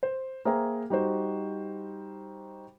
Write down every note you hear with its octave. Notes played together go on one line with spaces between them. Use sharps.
C5
A#3 G#4 C5 E5 G5 A#5
G3 D#4 F#4 C5